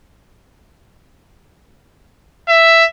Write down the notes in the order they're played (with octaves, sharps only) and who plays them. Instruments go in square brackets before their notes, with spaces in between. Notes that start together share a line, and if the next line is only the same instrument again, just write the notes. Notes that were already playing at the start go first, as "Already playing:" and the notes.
[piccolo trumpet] E5